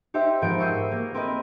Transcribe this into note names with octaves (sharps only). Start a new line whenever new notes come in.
D#4 G4 C5 E5
G#2 F3 B3 A#4 G6 D7
C#6 D#6 E6 G6 C7
A#3 A#4
C4 A#4 B4 D#5